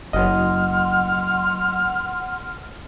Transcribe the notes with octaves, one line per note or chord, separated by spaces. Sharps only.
F#1 F#3 D#5 F#5 C6 F6